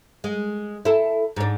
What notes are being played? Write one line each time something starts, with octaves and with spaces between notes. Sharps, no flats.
G#3
E4 A4
G#2 D4